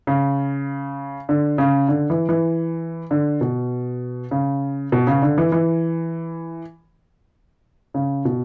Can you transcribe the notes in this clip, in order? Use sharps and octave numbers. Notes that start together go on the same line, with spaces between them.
C#3
D3
C#3
D3
E3
E3
D3
B2
C#3
B2
C#3
D3
E3
E3
C#3
B2